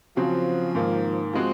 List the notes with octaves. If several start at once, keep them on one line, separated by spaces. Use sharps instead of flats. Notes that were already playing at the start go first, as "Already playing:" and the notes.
C#3 F3 F#3 C4 F#4
G#2 D#3 A#3
F3 G#3 C4 F#4